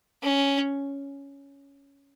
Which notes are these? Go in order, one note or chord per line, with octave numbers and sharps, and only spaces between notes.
C#4